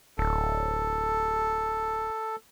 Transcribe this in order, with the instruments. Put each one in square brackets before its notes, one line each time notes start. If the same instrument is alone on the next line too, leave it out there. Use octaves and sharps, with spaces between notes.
[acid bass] D1 [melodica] A4